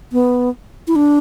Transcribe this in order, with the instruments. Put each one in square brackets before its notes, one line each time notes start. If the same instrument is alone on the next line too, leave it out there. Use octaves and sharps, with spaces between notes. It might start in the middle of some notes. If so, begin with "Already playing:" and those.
[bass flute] B3
E4
D4